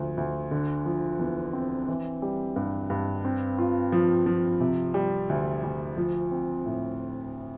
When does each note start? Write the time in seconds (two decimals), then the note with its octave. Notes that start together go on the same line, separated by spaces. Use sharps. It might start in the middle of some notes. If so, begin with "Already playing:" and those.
Already playing: D2 F3
0.17 D2
0.51 D3
0.85 F3
1.19 E2
1.53 C4
1.88 E3
2.22 G3
2.56 G2
2.90 G2
3.25 C4
3.58 F4
3.92 F3
4.26 F3
4.61 C3
4.94 G3
5.29 D2
5.63 D2
5.97 F3
6.31 C4
6.66 A2